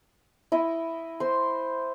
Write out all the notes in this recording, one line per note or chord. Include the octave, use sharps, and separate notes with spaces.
E4 D#5
C5 C6